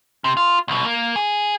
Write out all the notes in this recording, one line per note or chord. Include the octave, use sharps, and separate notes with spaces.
C3
F4
C2 B2
A#3
G#4